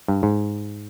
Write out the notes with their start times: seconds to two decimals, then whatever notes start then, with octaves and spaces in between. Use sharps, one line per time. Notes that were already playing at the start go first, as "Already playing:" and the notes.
0.08 G2
0.23 G#2